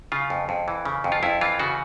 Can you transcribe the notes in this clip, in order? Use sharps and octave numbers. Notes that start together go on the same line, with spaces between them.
C#3 F4
F2
F2
E3
C#3
F2
F4
F2 E4
E3 F4
C#3 F#4